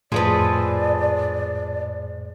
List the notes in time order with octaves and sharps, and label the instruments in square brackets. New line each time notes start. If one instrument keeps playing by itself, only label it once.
[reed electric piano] F2 A2 [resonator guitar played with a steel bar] F3 G#3 B4 [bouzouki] G#4 A4 [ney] D5